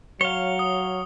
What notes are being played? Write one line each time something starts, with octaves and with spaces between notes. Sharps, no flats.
F#3 C#5 F5 G7
D#6